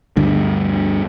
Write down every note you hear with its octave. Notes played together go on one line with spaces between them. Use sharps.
D2 G2 D3